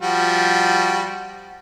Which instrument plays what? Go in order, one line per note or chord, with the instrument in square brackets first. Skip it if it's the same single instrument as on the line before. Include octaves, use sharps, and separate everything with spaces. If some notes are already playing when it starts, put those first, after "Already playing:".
[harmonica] F3 G3 F#4